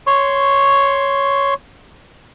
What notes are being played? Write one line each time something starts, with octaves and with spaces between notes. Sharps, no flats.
C#5 C6 C#6